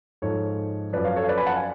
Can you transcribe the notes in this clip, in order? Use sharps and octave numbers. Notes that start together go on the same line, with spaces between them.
G#2 F3 A4 C#5
F#2 F3 B4 D5
C#5 F5
A4 C#5
F5
B4 D5
G#5 B5
F#5 A5
F5 G#5